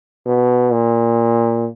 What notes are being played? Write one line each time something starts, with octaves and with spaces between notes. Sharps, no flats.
B2
A#2